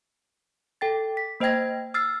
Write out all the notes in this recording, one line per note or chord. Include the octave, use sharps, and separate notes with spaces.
A4 G5 A6
B6
A#3 C5 D#5 G5 G#6 A#6
E6 F6 A6 C7